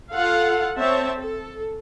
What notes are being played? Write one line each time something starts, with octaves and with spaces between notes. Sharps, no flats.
F4 A4 F5 F#5
C4 C#5 E5 A5
A4